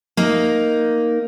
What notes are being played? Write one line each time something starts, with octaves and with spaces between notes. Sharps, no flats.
A#3 D#4